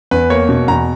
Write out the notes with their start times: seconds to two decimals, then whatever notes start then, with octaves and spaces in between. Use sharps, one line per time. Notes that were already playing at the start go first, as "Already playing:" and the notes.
0.11 E2 B4
0.30 A#3 C#5
0.49 B2
0.68 E2 A#5